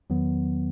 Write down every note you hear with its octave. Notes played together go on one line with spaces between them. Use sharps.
E2 D#3 F#3 B3